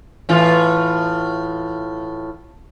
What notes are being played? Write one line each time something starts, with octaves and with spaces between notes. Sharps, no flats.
A2 E3 F4